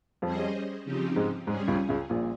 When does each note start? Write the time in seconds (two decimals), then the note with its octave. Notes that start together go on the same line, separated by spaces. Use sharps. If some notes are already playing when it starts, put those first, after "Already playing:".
0.22 F2 F3 G3 C#4 G#4 C5 D#5
0.85 C#3 F3 C4 D#4 G4
1.16 G#2 G#3
1.47 G#2 G3 G#3 C#4 G#4
1.68 C#2 C#3
1.89 C#2 C#3
2.10 A#1 A#2